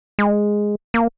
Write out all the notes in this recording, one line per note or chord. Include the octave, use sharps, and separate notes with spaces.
G#3
A#3